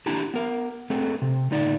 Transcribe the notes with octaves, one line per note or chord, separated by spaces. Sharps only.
D4 E4 G4 A5 A#5
B3 A#4
A3 C4 G#4 A4
C3
A2 D3 D#4 D5